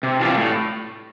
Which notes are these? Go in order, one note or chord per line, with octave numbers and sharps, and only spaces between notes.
C3
E3 G3 D4 F4
A2